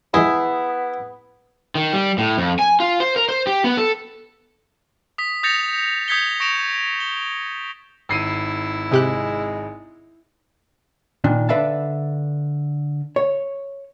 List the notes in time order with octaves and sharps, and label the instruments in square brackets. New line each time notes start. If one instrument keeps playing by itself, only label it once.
[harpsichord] F#2 E3 G#3 [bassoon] B3 [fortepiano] E4 [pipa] G#4
[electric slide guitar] D#3
G3
A2
F2
G#5
F4
C5
A#4
C5
G4
B3
A4
[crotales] D#6 B6
D#6 G6 A6 A#6 C#7 F7
D#6 G6 G#6 B6 C#7 G7
C#6 A#6 D7 E7 F7
G7
[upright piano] G#1 C7 D#7 [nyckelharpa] E4
[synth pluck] C3 G4 F#6 [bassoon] G#3
[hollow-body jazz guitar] A#2 D#3 D4
D3 B4 D5 E5 F5 A5
C#5